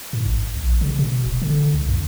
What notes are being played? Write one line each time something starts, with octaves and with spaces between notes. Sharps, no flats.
G#2
G#1
A#1
C#3
B2
D#1
D3
C2
F2